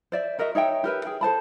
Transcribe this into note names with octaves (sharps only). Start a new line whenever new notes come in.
C5 D5 E5
F#4 A#4 D#5 E5
D#4 C#5 E5 G5
G4 A#4 B4 E5
G#4 G5
A4 C5 A5 B5